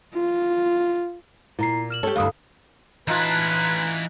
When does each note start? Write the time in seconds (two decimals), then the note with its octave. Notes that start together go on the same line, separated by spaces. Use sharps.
0.14 F4
1.59 A#2 E4 A#5 C7
1.90 F6 E7 F#7
2.03 G4 A4 C#5
2.16 D2 G2 E4 F5 D#6
3.08 E3 D#4 F4 B4 A5 A#5 F#6 G#6